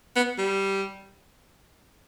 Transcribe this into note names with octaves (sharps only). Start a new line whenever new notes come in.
B3
G3